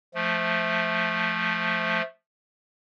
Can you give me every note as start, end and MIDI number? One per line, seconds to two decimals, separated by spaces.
0.14 2.02 53
0.14 2.02 57